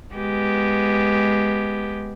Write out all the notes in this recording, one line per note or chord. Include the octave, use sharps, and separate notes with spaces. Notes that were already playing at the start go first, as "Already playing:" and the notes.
G#3 B3 G4